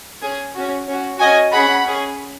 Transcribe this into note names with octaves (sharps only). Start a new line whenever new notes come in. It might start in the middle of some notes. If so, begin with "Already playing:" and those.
C#4 G#4
C#4 F#4
C#4 F#4
C#4 F#4 D#5 G#5
C#4 G#4 F#5 B5
C#4 G#4